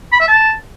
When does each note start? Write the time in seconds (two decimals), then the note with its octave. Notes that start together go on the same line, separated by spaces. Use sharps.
0.12 B5
0.20 E5
0.28 A5